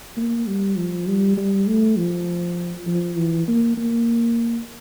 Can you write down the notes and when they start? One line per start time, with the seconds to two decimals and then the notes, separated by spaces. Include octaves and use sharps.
0.17 A#3
0.47 G3
0.77 F3
1.07 G3
1.37 G3
1.67 A3
1.97 F3
2.87 F3
3.17 E3
3.48 A#3
3.78 A#3